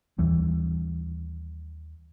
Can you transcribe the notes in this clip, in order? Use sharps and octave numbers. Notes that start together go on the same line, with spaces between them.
D#2 E3 G3